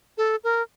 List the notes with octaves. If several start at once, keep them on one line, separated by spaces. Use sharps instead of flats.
A4
A#4